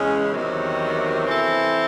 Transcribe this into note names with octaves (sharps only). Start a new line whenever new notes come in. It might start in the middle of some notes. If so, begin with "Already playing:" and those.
Already playing: E2 C#3 G#3 C#4
E2 C3 D#3 F#3
E3 C4 E4 A4